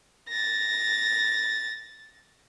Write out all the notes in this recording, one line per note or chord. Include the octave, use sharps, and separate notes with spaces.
A6 A#6